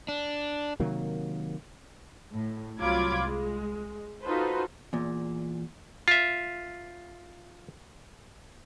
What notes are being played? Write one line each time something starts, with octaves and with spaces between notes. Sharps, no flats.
D4
C3 D#3 F#3 A#3
A2
C2 F#3 F4 B5 D6 G#6
G#3
D#4 F4 F#4 A4 B4 C5
E2 A#2
F4 E5